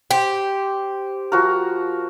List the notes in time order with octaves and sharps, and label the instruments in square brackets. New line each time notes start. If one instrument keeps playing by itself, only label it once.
[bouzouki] G4 [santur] C5
[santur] F3 F#4 A#4